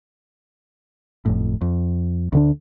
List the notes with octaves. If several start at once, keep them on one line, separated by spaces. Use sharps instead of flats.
G1 F2 A2
F2
D2 D3 D4